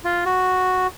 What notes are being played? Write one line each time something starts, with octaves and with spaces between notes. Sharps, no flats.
F4
F#4